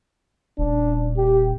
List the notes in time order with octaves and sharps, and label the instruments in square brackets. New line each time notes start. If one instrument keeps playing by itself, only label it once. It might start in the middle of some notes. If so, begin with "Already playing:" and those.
[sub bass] D#1 [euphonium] D4
[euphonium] G4